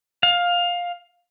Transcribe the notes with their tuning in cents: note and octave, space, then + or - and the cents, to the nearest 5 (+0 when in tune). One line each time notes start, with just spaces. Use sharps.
F5 +15